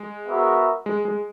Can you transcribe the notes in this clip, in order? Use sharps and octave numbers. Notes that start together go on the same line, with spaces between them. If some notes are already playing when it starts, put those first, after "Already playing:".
Already playing: G#3
B3 F#4 A#4 E5
G#3
G#3